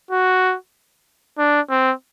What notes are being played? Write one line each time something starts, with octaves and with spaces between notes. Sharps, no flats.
F#4
D4
C4